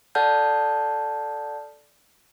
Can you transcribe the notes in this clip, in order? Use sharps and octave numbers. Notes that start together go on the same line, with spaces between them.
A4 D5 F#5 A5 F6 G6